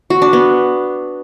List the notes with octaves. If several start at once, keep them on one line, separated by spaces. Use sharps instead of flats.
F#4
D4
B3